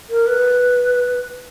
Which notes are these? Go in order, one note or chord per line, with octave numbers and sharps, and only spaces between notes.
A#4
B4